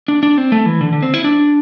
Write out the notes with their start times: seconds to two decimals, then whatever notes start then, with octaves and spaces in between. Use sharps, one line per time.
0.08 D4
0.23 D4
0.38 C4
0.52 A3
0.66 E3
0.81 D3
0.93 D3
1.03 C4
1.14 E4
1.24 D4